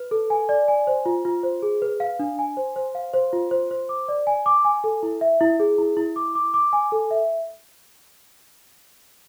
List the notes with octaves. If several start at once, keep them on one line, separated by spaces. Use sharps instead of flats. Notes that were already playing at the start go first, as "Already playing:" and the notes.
Already playing: B4
A4
G#5
D5
G#5
C5
F4
F4
C5
G#4
B4
F5
D4
G#5
C5
C5
F5
C5
F4
C5
C5
D6
D5
G#5
D6
G#5
A4
E4
E5
E4
G#4
E4
E4
D6
D6
D6
G#5
A4
E5